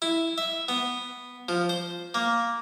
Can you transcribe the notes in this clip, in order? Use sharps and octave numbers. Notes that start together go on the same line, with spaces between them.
E4
E5
B3
F3
C5
A#3